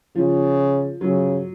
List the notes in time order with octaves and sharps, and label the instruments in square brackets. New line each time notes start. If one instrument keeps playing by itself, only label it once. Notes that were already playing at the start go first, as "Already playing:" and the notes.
[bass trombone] C#3 [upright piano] F3
[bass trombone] C#3 [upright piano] F#3